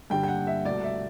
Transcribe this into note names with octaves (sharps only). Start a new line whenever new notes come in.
G2 D3 G3 G5
G5
F#5
E5
C2 B2 A3 D5
E5